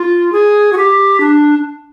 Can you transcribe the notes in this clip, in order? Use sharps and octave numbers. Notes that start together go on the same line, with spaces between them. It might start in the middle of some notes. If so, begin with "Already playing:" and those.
Already playing: F4
G#4
F#4
G4
D4